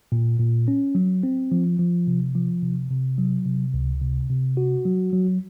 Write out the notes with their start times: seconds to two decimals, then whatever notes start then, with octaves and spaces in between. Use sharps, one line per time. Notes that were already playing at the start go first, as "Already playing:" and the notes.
0.12 A#2
0.40 A#2
0.68 C#4
0.95 F#3
1.23 C4
1.52 F3
1.79 F3
2.07 C3
2.35 F3
2.63 C3
2.91 C3
3.18 F#3
3.46 C3
3.74 C#2
4.02 C3
4.30 C3
4.57 F#4
4.86 F#3
5.13 F#3